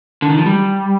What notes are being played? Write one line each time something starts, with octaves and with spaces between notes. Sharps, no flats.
D3
D#3
F3
G3